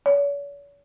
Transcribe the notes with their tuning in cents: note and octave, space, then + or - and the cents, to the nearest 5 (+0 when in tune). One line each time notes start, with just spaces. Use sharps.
C#5 +45